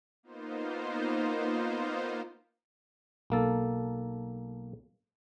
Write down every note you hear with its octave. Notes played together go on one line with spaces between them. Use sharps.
A#3 B3 D#4 F4 C5
B1 A#3 A4